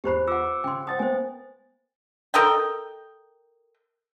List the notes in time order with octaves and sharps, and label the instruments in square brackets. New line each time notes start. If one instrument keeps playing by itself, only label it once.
[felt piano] E2 F#6 C7 [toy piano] G4 C5 B5
[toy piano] F4 F#5 [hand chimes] D6 E6 C#7
[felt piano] C#3 [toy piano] G5 C6
[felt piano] C5 F#5 A5 [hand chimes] G5 A6 [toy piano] D#6
[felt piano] A#3 B3 [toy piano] C5 G#5
[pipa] A4 A#4 D#5 G5